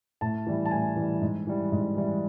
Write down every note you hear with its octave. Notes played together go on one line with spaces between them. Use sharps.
A2 A5
E3 G3
A5
A2 G#5
E3 G3
G#2
E3 G3
G#2
E3 G3